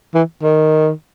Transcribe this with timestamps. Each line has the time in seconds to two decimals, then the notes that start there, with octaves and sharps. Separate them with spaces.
0.15 E3
0.42 D#3